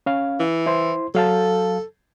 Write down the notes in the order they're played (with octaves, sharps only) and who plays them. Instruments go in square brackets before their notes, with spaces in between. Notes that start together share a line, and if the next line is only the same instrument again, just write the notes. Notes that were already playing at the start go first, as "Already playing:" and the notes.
[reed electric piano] C#4 F5
[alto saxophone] E3
[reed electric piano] E4 C5 C6
[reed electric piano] F#3 F5 A5 [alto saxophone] A4